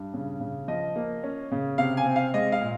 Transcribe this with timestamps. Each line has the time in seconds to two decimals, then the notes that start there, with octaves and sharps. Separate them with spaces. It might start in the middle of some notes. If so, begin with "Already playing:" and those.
Already playing: G2
0.14 C#3
0.40 C#3
0.68 F3 D#5
0.96 A#3
1.23 C#4
1.52 C#3
1.78 C3 F5
1.97 G#5
2.06 C4
2.16 F5
2.34 G#3 D#5
2.52 F5
2.61 A#2